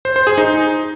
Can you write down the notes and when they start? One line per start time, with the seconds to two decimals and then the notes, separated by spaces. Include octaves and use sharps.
0.05 C5
0.16 C5
0.27 G#4
0.38 D#4